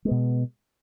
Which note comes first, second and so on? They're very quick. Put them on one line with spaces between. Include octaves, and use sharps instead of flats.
G#3 B3 B2